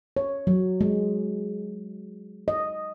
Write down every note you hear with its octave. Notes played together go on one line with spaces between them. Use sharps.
C#5
F#3
G#3
D#5